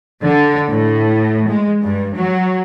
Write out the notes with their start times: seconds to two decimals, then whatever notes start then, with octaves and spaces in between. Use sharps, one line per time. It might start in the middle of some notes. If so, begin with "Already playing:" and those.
0.23 D3
0.70 A2
1.49 G#3
1.83 G2
2.16 F#3